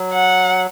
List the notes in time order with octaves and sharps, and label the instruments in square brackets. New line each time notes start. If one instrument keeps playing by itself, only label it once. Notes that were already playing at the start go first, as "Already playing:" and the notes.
Already playing: [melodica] F#3
[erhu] F#5